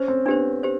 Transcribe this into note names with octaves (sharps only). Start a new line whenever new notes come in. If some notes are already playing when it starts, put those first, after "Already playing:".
Already playing: C#4 C5
C4
B3 D4 G4 C5
G4 C5